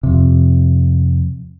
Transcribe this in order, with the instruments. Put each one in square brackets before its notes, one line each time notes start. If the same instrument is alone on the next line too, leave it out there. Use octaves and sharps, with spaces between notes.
[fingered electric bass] F2 C3